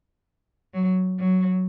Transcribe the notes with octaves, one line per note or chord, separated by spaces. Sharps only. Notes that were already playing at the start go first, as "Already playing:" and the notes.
F#3
F#3